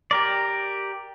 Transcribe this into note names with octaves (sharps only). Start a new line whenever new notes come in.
G4 A#4 D5